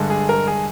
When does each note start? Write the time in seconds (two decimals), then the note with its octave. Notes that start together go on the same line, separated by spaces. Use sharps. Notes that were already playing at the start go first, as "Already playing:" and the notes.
Already playing: G2 D3 G#3
0.10 G#4
0.29 A#4
0.47 G#4